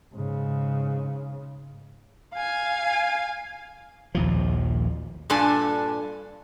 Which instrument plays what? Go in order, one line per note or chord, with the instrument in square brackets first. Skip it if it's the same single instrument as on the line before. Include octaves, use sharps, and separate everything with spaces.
[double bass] G#2 C#3
[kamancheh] F5 G#5
[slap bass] A#1 D#2 F3
[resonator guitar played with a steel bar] G2 A#2 D4 A4 G#5